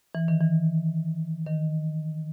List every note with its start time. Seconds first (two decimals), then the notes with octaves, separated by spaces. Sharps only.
0.15 E3
0.28 D#3
0.41 E3
1.46 D#3